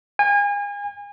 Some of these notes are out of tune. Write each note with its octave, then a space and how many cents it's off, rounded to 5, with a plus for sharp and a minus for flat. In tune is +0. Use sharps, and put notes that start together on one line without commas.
G#5 -35